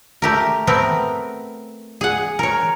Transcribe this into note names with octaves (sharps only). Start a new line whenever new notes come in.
A3 G4 A#4
A3 B3 C4 A#4
G#4 F#5
A#4 C#5